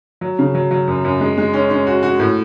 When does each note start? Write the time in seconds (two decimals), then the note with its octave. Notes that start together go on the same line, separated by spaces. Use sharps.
0.21 F#3
0.39 C#3
0.55 F#3
0.71 F#3
0.87 F#2
1.05 F#2
1.20 G#3
1.38 G#3
1.53 C#4
1.70 C#4
1.87 F#4
2.03 F#4
2.20 A2